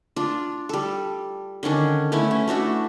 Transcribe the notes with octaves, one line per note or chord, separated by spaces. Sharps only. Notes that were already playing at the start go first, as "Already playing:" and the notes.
D4 F4
G3 A4
D3 D#3 C#4 D4
A3 B3 C#4 E4
C#4
A3 D4 F#4 E5